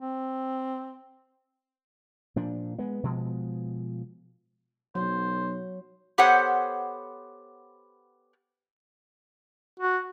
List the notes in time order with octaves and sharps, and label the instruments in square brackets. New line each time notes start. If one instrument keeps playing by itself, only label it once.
[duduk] C4
[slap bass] A#2 F3 D4
G#3 B3
B2 F3 G#3
[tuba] B1 [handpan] F#3 [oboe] C5
[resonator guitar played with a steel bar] B3 G4 A4 C5 C#5 F#5
[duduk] F#4